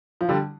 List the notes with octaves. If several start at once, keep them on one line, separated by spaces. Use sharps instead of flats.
F3
D3 G3